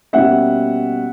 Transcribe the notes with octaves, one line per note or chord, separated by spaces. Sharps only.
B2 G3 A#3 C#4 E5 F#5